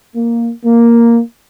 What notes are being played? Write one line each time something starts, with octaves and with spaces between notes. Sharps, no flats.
A#3
A#3